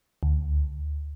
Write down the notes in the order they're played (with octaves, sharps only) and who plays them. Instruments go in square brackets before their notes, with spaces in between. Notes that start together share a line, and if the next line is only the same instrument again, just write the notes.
[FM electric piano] D2